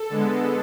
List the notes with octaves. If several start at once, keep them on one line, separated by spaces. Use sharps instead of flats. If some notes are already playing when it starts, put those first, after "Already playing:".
Already playing: A4
D3 G#3 B3